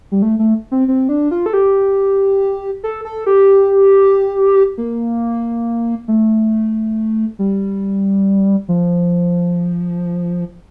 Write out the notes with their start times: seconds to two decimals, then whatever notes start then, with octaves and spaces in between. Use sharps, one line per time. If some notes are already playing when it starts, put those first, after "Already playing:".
0.12 G3
0.22 A3
0.39 A3
0.72 C4
0.88 C4
1.09 D4
1.31 F4
1.46 A4
1.53 G4
2.84 A4
3.05 A4
3.26 G4
4.78 A#3
6.08 A3
7.39 G3
8.68 F3